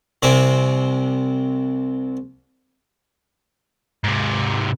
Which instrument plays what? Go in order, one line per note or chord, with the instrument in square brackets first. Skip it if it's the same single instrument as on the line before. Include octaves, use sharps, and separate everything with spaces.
[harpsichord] C2 C3 G3 C4 G#5 D6
[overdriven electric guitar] G#2 C3